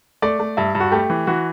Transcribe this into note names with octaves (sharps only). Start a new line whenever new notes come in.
A3 D5
A3
G2 E5
G2
F#4
A3 G4
E3
E3 F#4